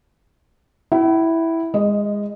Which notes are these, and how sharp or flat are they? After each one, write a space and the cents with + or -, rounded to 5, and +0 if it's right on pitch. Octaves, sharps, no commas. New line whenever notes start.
E4 -5 F#5 +45
G#3 -20 D#5 +0